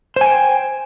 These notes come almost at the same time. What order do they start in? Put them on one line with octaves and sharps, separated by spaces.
C5 G#5 G5